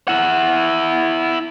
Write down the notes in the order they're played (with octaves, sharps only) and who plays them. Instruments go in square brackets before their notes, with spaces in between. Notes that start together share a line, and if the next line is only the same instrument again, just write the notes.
[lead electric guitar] E4 F#5